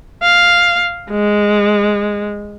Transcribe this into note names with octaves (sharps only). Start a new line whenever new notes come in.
F5
G#3